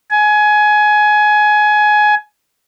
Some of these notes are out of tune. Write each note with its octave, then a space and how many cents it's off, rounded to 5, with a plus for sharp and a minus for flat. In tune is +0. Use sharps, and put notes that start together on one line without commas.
G#5 +20